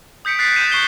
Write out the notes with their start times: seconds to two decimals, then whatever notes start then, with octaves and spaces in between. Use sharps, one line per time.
0.25 D#6 G6 B6 C#7 D7
0.39 F#6 A6 B6 C7
0.56 G6 A6 D#7 E7
0.72 C#6 F#6 C7 G7